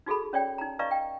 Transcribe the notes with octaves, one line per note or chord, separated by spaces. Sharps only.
D#4 F#4 G#4 A4 B5
C#4 C#5 D5 G5
D#4 A#5
B4 D5 D#5 F5 A#5 C#6
G5